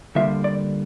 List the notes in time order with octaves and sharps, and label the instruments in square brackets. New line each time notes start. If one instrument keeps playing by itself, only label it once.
[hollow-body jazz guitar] D3 G3 A#3 F4 E5
D5